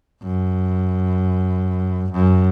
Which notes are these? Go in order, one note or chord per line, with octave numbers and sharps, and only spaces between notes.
F#2
F#2